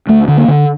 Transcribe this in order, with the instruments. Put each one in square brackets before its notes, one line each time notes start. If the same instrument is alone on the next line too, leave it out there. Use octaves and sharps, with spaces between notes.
[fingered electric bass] D2 A3
D3
A#3
D3